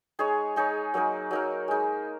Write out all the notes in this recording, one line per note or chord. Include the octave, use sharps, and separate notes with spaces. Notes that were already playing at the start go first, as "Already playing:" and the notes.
G#3 D#4 G#4 C#5
G#3 D#4 G#4 C#5
F#3 A#3 D#4 A#4
F#3 A#3 D#4 A#4
G#3 D#4 G#4